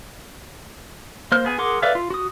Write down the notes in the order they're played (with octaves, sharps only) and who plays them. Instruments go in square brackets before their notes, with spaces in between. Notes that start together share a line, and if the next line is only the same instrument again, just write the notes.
[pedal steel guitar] A#3 C5 F6
B3 G#4 G#5
G#4 A#4 F#5 C6 D6
A4 B4 D5 E5 F5
F4
F#4 D#6